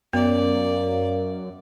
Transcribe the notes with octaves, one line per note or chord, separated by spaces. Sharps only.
F#2 A#3 B3 D5